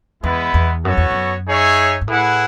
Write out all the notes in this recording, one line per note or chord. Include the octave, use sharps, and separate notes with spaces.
E2 G#3 B3 E4 B4
E2
F#2 B3 F#4 A4 C#5
E2
F#2
D#4 G#4 C#5 E5
G#2
A2 E4 G#4 B4 F#5